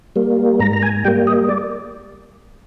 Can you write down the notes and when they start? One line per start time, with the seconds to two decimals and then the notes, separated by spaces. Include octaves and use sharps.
0.16 G3 A#3
0.60 G#2 A#5
0.73 A#5
0.83 G#5
1.04 G3 A#3 G5
1.27 D#5
1.49 D5